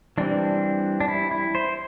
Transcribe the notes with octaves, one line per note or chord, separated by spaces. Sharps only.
E3 G3 C4 D4
D4
E4
E4
C5